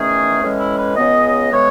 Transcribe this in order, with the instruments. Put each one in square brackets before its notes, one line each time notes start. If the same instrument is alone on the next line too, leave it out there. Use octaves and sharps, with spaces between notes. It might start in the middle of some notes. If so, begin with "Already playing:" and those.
Already playing: [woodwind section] E2 D#3 A3 C#4 G#4
A2 E3 G#3 C#4
E4
B4
C#2 C#3 G#3 B3 D#5
A2 E3 G#3 B3 C#5